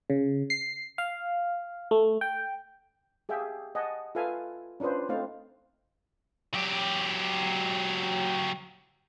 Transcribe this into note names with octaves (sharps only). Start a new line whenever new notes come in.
C#3
C7
F5
A3
G5
G4 G#4 E5 F5 G5
D#5 F#5 G#5 A5
F4 A4 B4 E5 F5 G#5
C#4 D4 F4 B4 C5
A3 C4 D#4 C5 F5
F#3 G4